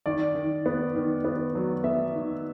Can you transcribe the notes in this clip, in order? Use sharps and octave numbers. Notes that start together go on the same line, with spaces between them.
D#3 D5
D#3
B3
D#3
B3
F#3
B3 E5
D#3